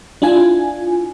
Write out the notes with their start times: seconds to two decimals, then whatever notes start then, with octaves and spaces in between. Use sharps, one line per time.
0.22 D4 E4 F4 G#5